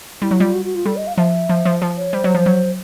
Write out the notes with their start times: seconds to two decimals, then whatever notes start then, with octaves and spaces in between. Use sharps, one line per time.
0.22 G3 E4
0.31 F#3
0.38 G3 F4
0.54 F#4
0.65 F#4
0.75 F4
0.86 G3 A4
0.96 D#5
1.07 F5
1.17 F3 E5
1.49 F3
1.65 F3
1.82 F3
1.97 C#5
2.13 G3 C5
2.24 F#3
2.35 F3
2.46 F#3